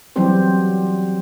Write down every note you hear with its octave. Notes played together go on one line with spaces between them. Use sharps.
E3 F#3 G3 C4 G4 C5